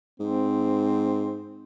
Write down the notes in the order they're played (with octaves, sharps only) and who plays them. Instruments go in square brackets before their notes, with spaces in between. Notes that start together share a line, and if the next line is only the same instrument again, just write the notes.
[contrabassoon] G#2 [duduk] C4